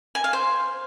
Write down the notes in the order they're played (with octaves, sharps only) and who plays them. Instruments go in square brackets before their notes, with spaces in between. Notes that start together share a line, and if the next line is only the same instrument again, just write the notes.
[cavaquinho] G#5
F5
C5